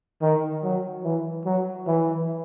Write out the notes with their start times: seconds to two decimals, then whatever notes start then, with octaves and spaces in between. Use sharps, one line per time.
0.21 D#3
0.63 F#3
1.04 E3
1.45 F#3
1.87 E3